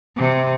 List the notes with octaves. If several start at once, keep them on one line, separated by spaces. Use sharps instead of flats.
C3